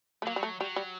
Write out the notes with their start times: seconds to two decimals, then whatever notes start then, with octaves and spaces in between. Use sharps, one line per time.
0.22 A3
0.26 F#3 A#3
0.36 G3
0.43 A3
0.60 F#3 G3
0.76 G3